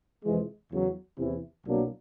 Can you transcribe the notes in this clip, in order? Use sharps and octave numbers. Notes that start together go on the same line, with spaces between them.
F2 C3 E3 G#3
E2 C#3 F#3
E2 C3 E3
C2 B2 F#3 A#3 D4